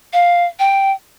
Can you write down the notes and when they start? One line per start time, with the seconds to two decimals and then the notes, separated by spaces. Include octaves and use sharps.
0.13 F5
0.59 G5